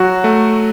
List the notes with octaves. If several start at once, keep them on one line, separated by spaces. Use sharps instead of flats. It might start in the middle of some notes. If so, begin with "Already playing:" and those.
Already playing: F#3 F#4
A3